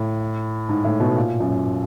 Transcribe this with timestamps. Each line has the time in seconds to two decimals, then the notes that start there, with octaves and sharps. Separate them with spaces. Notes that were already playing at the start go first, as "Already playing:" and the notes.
Already playing: A2
0.69 G#2
0.84 A2
1.00 B2
1.16 A#2
1.40 F#2